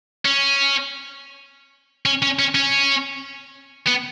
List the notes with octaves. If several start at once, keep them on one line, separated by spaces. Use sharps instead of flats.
C#4
C#4
C#4
C#4
C#4
B3